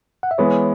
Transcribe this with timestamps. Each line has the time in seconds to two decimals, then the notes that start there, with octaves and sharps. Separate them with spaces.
0.23 F#5
0.31 E5
0.38 E3 G#3 B3 C#5